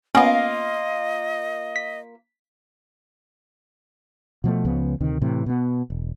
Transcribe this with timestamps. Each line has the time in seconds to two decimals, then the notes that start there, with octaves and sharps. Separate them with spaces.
0.15 A#3 B3 C#4 F4 D#5
1.76 B6
4.44 B2 F3 F#3 A3
4.65 C#2 C#3 F3 B3
5.00 D2 C3 D#3
5.21 A2 C3 E3
5.46 B2 B3
5.90 E1